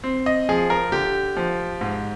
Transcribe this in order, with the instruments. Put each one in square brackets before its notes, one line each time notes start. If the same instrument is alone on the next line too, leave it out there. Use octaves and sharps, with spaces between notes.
[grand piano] C4
D#5
F3 G#4
A#4
D3 G4
F3
G#2